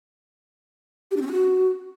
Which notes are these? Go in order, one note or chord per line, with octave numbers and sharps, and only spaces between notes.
G4
D4
C4
C#4
F#4